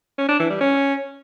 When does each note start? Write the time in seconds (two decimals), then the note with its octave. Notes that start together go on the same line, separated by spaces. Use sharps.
0.18 C#4
0.29 D4
0.39 E3
0.50 G3
0.61 C#4